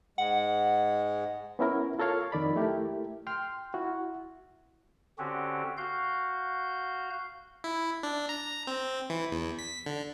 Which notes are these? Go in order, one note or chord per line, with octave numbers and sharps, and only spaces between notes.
G#2 G#3 F#5
B3 C#4 E4 A#4
F4 A4 A#4 C#5 F5
F2 D#3 D5 B5
A3 E4 G4 A#4
G5 C6 F6
E4 F#4
D3 C4 C#4 F#4 G4
F#4 F5 G6
E4
D4
A#5
C4
E3
E2
B6
D3